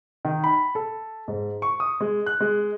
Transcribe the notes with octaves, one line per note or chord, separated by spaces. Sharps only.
D#3
B5
A4
G#2
C#6
D#6
G#3
F#6
G#3